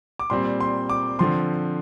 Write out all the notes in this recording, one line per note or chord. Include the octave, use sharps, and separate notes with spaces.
D6
A#2 G3 C4 C6
C6
D6
D3 F3 C4 C6